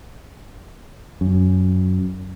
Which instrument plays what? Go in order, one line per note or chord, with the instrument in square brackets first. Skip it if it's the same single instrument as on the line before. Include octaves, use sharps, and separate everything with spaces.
[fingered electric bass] F#2